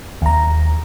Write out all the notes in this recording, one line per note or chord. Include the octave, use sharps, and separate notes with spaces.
D#2 A#5